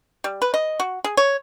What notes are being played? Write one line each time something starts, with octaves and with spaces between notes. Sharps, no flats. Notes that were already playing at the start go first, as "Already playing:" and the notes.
G3
B4
D#5
F#4
G#4
C#5